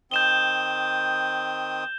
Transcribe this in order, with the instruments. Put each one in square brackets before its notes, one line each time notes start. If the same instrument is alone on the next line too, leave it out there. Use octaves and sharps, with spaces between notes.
[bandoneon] D#3 C4 D#6 [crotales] G6 E7 G7